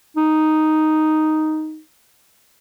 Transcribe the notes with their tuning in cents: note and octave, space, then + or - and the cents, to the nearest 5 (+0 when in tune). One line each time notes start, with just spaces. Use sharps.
D#4 +0